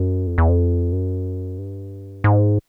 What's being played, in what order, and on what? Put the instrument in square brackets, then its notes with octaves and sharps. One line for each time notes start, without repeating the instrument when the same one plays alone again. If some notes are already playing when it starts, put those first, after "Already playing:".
Already playing: [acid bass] F#2
F2
E2
F2
F#2
G2
G#2